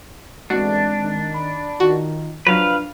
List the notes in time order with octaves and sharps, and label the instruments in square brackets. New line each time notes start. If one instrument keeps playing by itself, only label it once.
[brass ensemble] A1 E2 D3 [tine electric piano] G#3 C4 [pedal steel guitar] D4 [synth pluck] F#4
[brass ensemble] D#3
[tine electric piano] B5
[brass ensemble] D#3 [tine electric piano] F4 [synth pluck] F#4
[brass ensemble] F3 [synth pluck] F#3 [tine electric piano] D4 F4 [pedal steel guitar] B4 F5